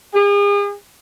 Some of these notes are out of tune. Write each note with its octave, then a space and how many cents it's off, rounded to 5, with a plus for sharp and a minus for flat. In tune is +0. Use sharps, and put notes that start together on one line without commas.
G#4 -40